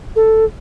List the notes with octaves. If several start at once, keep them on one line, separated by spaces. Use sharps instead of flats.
A4